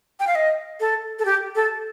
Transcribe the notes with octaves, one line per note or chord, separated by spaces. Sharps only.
G5
F5
D#5
A4
A4
G4
A4